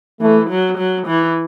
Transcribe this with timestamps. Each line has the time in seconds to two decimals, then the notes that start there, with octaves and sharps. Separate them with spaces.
0.20 E3 A3
0.50 F#3
0.78 F#3
1.07 E3